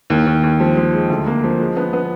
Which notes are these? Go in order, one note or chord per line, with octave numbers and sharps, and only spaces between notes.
D#2
D#2
D#2
F3
F3
G#3
D2
A#3
F3
G#3
B3
B3